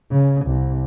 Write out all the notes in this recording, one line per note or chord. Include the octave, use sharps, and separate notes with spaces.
C#3
C2